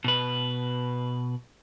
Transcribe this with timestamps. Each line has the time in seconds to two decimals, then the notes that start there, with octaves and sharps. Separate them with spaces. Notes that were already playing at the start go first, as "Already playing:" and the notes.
0.04 B2 B4